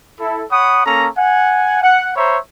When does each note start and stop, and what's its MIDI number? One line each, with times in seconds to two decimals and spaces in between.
0.20 0.44 64
0.20 0.44 69
0.51 0.84 73
0.51 0.84 78
0.51 0.84 83
0.51 0.84 87
0.86 1.07 58
0.86 1.07 61
0.86 1.07 69
0.86 1.07 82
1.18 1.78 78
1.18 1.78 80
1.83 2.12 78
2.16 2.38 72
2.16 2.38 73
2.16 2.38 76
2.16 2.38 82
2.16 2.38 83